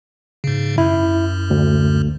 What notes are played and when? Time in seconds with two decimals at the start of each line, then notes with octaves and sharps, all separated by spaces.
0.44 G#2 C#3
0.78 F#2 E4
1.50 D2